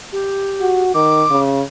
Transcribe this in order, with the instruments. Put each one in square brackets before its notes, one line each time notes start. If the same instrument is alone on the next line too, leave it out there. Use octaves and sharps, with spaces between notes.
[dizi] G4
[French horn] F#4
[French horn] D#3 [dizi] D6
[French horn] C#3